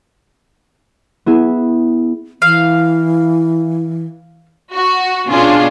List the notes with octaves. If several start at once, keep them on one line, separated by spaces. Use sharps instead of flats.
B3 E4 G#4
E3 F5
F#4
B2 C#4 D4 F4 G#4